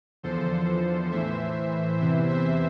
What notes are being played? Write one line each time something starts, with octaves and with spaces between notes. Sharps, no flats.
E2 D3 F3 A4 C5
A2 E3 C5 E5
E2 C3 E3 C5 E5
C5 E5